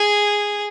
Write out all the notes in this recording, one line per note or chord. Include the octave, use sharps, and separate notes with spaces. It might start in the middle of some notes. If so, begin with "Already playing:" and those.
Already playing: G#4